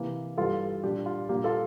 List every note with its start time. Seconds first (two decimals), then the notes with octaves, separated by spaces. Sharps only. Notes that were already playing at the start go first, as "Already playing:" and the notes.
Already playing: C3 E3 A#3
0.37 G2 E3 G3 F4 A4
0.83 A#2 G3 D4 G4
1.06 F4
1.29 A#2 G3 A#3 G4
1.44 F4 A4